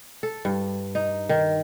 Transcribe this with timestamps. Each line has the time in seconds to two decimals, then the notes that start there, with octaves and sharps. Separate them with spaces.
0.23 A4
0.45 G2
0.95 D#4
1.29 D#3